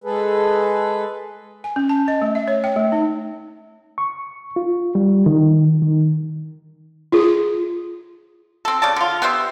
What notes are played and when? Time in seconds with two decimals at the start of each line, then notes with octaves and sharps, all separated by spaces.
0.04 G#3 G#4 A4 B4
1.64 G#5
1.76 C#4
1.89 A5
2.08 D#5
2.22 A3
2.35 E5
2.48 C#5
2.64 G5
2.76 A3
2.92 D#4
3.98 C#6
4.56 F4
4.95 G3
5.26 D#3
5.82 D#3
7.12 F4 G#4
8.65 C4 A4
8.82 C#3 D5 A5
8.96 D3 F4
9.22 B3 G4 C5 E5